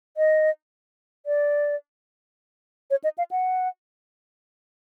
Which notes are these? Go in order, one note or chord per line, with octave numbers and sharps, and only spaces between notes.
D#5
D5
C#5
D#5
F5
F#5